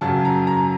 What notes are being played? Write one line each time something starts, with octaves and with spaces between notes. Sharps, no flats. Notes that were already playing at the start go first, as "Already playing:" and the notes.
F#2 C#3 F#3 A5
A#5
A#5